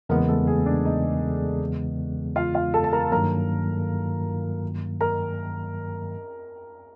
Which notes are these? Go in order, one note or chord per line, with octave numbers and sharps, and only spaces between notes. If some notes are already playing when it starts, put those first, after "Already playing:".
E2 C#3 E3 G#3 A#3 B3 A#4
A3 A4
G#4
D4 D5
D#4 D#5
F4 F5
F4 F5
A4 A5
A5
A#4 A#5
G2 D#3 F#3 A#3 A#4 A#5
A#4 A#5